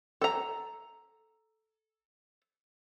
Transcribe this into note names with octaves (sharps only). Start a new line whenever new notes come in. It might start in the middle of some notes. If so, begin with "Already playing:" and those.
A4 A#5